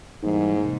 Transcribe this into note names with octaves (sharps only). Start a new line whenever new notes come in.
G#2 E3 G3 A#3 D#4
C3